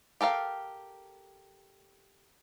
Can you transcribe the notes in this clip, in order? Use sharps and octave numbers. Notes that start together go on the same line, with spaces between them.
G4 A4 A#4 F5 G5